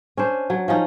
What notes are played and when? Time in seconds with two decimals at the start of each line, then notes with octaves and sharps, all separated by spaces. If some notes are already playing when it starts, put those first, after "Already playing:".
0.17 C#4 D4 C5
0.50 F#3
0.68 F3 C#4 D#4